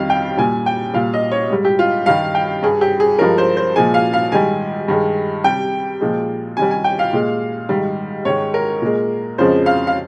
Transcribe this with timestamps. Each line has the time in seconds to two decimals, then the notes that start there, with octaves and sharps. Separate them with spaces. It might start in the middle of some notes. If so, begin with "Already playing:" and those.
Already playing: F2 D#3 G3 F5
0.10 G5
0.37 A#2 G3 G#5
0.66 G5
0.94 A#2 G3 F5
1.14 D#5
1.31 C#5
1.50 G#2 G3
1.65 G4
1.79 F4
2.06 G2 D#3 G3 F5
2.35 G5
2.63 G2 G3 G#4
2.81 G4
3.00 G#4
3.19 G2 F3 G#3 A#4
3.38 C5
3.57 C5
3.75 A#2 F3 G#3 G#5
3.94 F5
4.13 F5
4.32 G#2 D#3 G3 G#5
4.88 G2 D#3 G#3
5.44 C3 G3 G5
6.01 A#2 F3 G#3
6.57 C3 D#3 G3 G#5
6.71 G#5
6.84 G5
6.99 F5
7.13 A#2 G#3
7.69 G#2 D#3 G3
8.25 G#2 D#3 G#3 C#5
8.54 A#4
8.82 A#2 G#3
9.38 F2 C#3 F3 G#3 C5
9.66 F5
9.87 F5